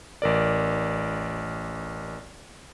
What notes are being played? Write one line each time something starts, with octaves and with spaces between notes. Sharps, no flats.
A1 A#4 D5